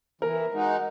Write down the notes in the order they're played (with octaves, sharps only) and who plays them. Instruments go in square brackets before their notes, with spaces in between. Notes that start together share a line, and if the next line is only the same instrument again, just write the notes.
[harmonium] E3 [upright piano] A#4
[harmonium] G#3 D#4 F#4